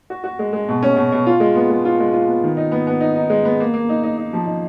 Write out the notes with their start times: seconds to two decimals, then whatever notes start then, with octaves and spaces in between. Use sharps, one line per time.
0.10 F#4
0.24 F#4
0.39 G#3
0.53 G#3
0.68 B2
0.83 C#4
0.96 B2
1.12 B2
1.27 F4
1.40 G#3
1.55 B3
1.70 G#3
1.85 F4
2.00 G#3
2.13 F4
2.28 B3
2.43 D#3
2.57 D#4
2.72 B3
2.87 B3
3.01 D#4
3.16 D#4
3.30 G#3
3.45 B3
3.60 A#3
3.74 A#3
3.89 D#4
4.03 D#4
4.17 D#4
4.33 F3
4.47 D#4